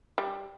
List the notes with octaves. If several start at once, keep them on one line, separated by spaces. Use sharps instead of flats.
G3